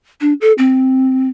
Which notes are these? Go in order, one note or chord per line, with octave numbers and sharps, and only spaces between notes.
D4
A4
C4